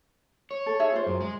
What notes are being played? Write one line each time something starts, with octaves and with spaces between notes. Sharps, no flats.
C#5
A4
D#4 G#4 E5
F4 C5
F#2
G#3